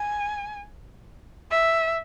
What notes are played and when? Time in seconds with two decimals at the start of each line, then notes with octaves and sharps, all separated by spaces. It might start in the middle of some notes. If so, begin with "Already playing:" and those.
Already playing: G#5
1.51 E5